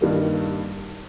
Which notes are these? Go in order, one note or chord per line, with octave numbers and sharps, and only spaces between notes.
G2 D#3 G3 A#3